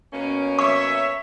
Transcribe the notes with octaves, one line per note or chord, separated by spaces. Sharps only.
B2 A#3 C#4
C#5 E5 C#6